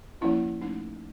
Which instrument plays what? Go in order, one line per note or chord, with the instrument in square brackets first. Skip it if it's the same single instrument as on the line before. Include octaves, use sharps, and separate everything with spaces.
[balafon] F3 A#3 C#4 E4
F3 A3 C#4 D#4